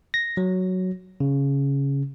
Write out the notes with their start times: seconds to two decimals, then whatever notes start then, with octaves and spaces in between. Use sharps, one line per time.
0.14 A#6
0.37 F#3
1.20 C#3